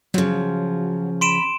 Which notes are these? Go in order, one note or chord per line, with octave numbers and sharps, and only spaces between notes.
C#3 F3 F#3
B5 C6 D7 E7